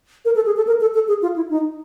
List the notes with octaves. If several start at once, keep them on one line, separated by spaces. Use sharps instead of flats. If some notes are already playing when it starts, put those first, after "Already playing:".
A#4
A4
G#4
A4
A#4
A4
A4
G#4
F4
E4
D#4